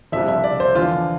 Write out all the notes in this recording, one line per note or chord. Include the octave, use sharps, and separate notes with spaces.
C2 C3 F3 E5
E5
D5
C5
E2 D3 F3 F4